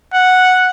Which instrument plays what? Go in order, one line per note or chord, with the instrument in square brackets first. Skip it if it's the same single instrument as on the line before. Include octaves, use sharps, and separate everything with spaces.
[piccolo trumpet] F#5